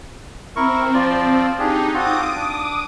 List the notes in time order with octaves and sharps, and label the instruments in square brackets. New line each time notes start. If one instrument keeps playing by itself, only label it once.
[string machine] C4 [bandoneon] E4 A#4 C#6
[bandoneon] F3 F4 D5
[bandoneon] D4 G4 G#4 [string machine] D#4
[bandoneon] C4 F4 F#4 [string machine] D6 D#6
[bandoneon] D4